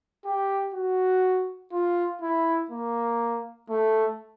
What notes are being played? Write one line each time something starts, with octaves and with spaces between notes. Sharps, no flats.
G4
F#4
F4
E4
A#3
A3